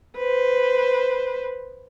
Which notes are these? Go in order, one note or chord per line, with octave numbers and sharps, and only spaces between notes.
B4 C5